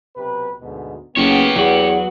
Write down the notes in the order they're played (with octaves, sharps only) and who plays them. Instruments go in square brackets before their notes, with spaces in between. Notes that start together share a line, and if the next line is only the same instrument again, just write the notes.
[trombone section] B1 C3 B4
D2 G#2 B2
[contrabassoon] F#1 [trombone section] B3 [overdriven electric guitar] G4 C#5
[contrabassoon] E2 [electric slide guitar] F#3 F#4